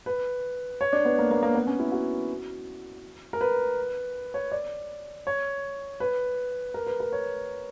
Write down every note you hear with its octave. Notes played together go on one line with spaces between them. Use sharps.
B4
C#5
D4
B3
A#3
A#3
A#3
B3
C#4
E4
F#4
A#4
B4
C#5
D5
C#5
B4
A#4
B4
A#4
C#5